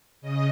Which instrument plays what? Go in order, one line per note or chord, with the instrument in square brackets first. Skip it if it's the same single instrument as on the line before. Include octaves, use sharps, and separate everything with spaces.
[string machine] C#3 D#5